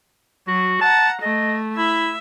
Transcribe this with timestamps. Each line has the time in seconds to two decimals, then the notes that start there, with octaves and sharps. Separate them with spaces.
0.48 F#3 F#4
0.81 F#5 A5 A#5
1.22 A3 D#5
1.76 E4 E5